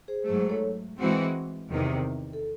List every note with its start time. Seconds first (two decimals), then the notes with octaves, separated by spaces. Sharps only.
0.08 G#4 C5
0.26 G#2 F#3 A3 G#4 C5
0.50 A4 C#5
0.98 E3 G#3 C4 F#4
1.70 E2 C3 D#3
2.33 A4